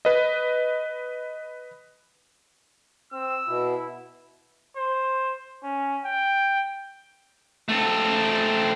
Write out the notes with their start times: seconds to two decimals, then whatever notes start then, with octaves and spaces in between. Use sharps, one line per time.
0.05 B4 D#5
3.13 C4 E6
3.48 B2 E4
4.77 C5
5.63 C#4
6.05 G5
7.69 A3 C4